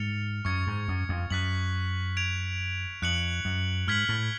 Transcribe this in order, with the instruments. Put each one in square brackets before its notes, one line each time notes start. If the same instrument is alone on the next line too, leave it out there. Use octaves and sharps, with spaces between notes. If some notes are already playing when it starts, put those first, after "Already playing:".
Already playing: [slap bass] G#2 [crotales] F6 A6 C#7 F7
[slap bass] F#2 [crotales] C#6 G#6 C#7
[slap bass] G#2
F#2
F2
[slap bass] F#2 [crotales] F#6 B6 F#7
[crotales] G#6 D7 F7
[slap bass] F2 [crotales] F#6 C#7 F#7
[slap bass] F#2
[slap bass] G#2 [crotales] F6 G#6 B6 F#7
[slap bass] A2